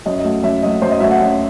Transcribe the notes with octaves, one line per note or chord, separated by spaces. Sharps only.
F#2 D#5
D#5
F#3 A3
F#2 E5
F#3 A3 D#5
F#2 C5
D#5
F#3 A3 E5
F#5
F#2